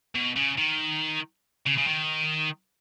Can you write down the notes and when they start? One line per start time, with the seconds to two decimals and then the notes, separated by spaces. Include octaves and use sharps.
0.15 B2
0.37 C#3
0.58 D#3
1.67 C#3
1.78 C#3
1.87 D#3